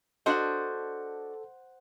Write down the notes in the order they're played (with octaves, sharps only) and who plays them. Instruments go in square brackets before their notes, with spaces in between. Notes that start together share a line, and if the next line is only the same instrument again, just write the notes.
[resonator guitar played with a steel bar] D4 F#4 D#5 [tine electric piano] A4 [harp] C5 F#5